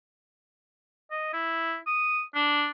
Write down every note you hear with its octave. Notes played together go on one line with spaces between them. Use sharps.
D#5
E4
D#6
D4